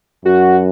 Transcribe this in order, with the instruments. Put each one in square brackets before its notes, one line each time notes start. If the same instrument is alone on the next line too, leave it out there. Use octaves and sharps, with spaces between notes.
[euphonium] F#2 [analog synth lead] F#4